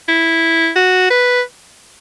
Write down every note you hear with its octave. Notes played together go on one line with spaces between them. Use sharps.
E4
F#4
B4